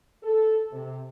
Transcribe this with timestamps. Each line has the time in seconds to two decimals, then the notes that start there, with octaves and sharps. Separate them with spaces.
0.23 A4
0.72 C3